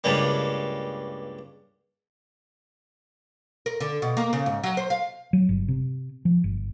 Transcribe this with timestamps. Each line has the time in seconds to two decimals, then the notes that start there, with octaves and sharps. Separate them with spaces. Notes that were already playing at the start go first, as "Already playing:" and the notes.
0.04 C#2 G2 C#3 G3 A#3
3.66 A#4
3.80 D3
4.02 B2
4.17 A#3
4.33 C#3
4.46 G#2
4.64 F#3
4.77 C5
4.90 F5
5.33 F#3
5.49 G1
5.68 C3
6.25 F3
6.44 G1